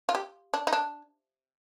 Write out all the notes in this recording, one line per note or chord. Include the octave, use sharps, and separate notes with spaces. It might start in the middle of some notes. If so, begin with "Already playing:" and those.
F4
G4
D4
D#4
D4